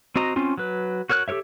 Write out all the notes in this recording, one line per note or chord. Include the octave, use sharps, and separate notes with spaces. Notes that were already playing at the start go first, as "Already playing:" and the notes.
C4 F#4 D#5 A#5
C4 C#4 F4
F#3 B4
F#4 A#4 C#5 F6 F#6
G4 A4 A#4 C#5 E5